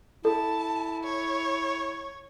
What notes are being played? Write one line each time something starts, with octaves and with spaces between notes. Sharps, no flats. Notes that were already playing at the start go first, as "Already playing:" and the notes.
E4 A4 A5
C#5